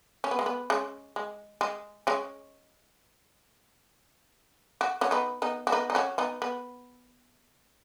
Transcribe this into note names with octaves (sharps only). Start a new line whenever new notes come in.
C#4
B3
G#3
B3
G#3 C#4
G#3
G#3
G#3 C#4
F#4
C#4 F#4
B3 D#4
B3 D#4
F#4
B3 D#4
D#4
C#4 F#4
B3 D#4
B3